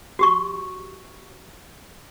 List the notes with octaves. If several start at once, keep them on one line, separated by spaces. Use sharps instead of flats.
F#4 G4 C#6